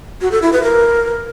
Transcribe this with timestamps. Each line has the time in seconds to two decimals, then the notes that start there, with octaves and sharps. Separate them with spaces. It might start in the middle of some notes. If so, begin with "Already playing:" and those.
0.21 F#4
0.32 A4
0.42 E4
0.53 B4
0.63 A#4